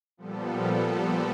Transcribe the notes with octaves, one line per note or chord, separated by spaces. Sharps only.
A#2 F3 G3 B3 A4